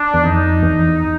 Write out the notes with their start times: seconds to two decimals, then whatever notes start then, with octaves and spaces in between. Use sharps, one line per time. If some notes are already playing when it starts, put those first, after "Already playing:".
Already playing: D4
0.14 E2
0.23 F2 D#4
0.63 E2